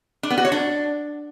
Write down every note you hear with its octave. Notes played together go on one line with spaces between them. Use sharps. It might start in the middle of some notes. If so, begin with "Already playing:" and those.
D4
B3
F#4
C#5
D4